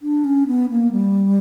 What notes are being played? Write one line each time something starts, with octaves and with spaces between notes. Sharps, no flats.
D4
C#4
B3
A#3
G3